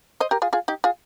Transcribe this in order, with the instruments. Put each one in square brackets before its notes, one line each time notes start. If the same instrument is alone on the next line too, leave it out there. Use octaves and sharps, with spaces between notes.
[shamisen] C5 D#5
G4 A#4
F4 G#4
F4 G#4
D#4 G4
F4 G#4